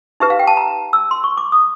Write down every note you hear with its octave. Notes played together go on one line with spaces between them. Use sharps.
D#4 G4 B4 E5
F5
G5
A5
A#5
E6
C6
C#6
D6
D#6